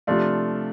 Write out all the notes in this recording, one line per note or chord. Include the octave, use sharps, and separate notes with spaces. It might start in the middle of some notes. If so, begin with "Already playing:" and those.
C3 F3 A3 D4 F4